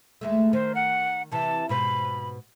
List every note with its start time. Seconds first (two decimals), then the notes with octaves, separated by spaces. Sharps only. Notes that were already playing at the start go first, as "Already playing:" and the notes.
0.21 D#2 G#3 A3
0.53 D#3 C5
0.75 F#5
1.32 C3 E3 A5
1.69 G#2 B2 C5 B5